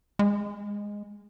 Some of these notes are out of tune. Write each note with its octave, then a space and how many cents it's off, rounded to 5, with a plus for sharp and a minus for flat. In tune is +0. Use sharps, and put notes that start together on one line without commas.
G#3 -10